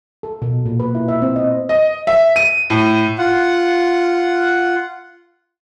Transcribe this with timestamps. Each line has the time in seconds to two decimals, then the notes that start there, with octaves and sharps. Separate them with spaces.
0.23 A4
0.42 B2
0.66 A#2
0.80 B4
0.95 E4
1.08 E5
1.22 C4
1.36 D#5
1.69 D#5
2.07 E5
2.36 D#7
2.70 A2
3.18 F4 F#5